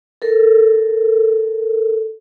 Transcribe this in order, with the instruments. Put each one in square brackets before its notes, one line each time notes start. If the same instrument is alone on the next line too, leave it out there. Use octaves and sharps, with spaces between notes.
[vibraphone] A4 A#4